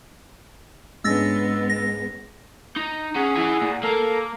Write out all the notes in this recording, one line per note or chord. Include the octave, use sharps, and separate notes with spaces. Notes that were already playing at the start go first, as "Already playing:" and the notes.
G#2 G#3 B3 C#4 D4 E6 A6 A#6
A#6
D#4
C#4 G#4 F#5
E4 G#5
A#2
A#3 A4 A#4